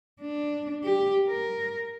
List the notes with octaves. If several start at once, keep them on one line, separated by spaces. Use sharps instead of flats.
D4
G4
A#4